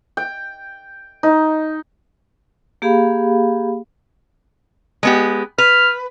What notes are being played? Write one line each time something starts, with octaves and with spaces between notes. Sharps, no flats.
G5
D#4
A#3 G4 G#4 F5 B5
G#3 B3 G4
B4 F6